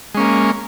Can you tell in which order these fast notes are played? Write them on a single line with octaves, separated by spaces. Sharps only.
G#3 C#4 A#3